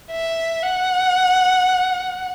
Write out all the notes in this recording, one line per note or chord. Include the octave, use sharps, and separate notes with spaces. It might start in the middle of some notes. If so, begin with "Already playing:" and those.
E5
F#5